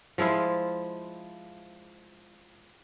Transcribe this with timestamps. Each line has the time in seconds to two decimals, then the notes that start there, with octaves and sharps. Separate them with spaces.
0.18 F3 G#3 E4 F4